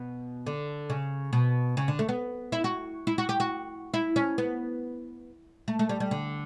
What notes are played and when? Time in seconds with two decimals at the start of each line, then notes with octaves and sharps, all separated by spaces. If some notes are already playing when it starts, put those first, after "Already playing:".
Already playing: B2
0.46 D3
0.90 C#3
1.33 B2
1.77 C#3
1.88 D3
1.99 A3
2.09 B3
2.52 E4
2.64 F#4
3.07 E4
3.18 F#4
3.29 G4
3.40 F#4
3.94 E4
4.16 C#4
4.38 B3
5.68 A3
5.79 A3
5.89 G3
6.00 G3
6.11 D3